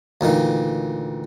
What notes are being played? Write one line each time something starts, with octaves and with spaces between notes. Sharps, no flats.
D2 A#2 D#3 E3